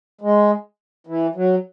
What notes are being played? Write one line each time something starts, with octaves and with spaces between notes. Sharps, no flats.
G#3
E3
F#3